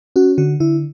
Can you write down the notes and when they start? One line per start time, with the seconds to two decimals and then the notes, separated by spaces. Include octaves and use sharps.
0.16 C#4 F#4
0.38 D3 F#4
0.60 D3 E4